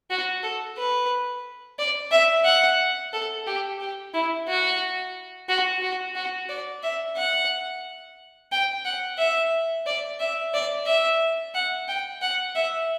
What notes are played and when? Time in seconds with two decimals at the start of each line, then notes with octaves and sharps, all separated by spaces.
0.10 F#4
0.43 A4
0.78 B4
1.79 D5
2.12 E5
2.45 F#5
3.13 A4
3.47 G4
3.80 G4
4.14 E4
4.48 F#4
5.49 F#4
5.83 F#4
6.15 F#4
6.50 D5
6.83 E5
7.17 F#5
8.52 G5
8.85 F#5
9.19 E5
9.87 D5
10.20 E5
10.54 D5
10.87 E5
11.55 F#5
11.88 G5
12.22 F#5
12.55 E5